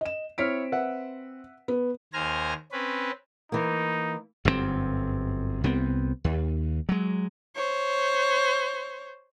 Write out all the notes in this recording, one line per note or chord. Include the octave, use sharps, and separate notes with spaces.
D#5 E7
C4 E4 C#5 F6 B6 D7
B4 E5 F#5
B3
D#2 C5 G#5 A#5 F6
C4 C#4 B4
E3 A#3 D#4
G1 F#2 A#2 C4
C2 B3 C4
D#2
F#3 G#3
C5 C#5